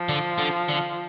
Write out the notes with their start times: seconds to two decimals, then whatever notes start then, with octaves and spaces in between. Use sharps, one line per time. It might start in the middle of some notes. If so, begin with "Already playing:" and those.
Already playing: F3
0.09 D3
0.38 D3
0.69 D3